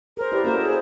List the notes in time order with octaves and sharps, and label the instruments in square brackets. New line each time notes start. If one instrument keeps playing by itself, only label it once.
[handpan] G#4 C5 [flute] A#4
[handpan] E4 B4 D5 [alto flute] G4
[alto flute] A#3 [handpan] C#4 F#4 A4 [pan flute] C5
[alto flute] G#4